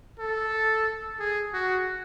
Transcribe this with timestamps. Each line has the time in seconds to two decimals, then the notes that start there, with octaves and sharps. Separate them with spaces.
0.19 A4
1.20 G#4
1.53 F#4